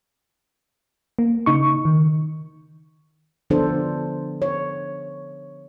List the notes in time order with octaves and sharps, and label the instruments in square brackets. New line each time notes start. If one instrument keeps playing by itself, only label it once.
[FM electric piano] A#3
C#3 D#4 C#6
D#3
[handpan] D3 F3 B3 D4 A4 C5
C#5